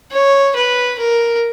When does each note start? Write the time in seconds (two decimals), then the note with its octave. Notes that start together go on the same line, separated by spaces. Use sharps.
0.11 C#5
0.55 B4
0.98 A#4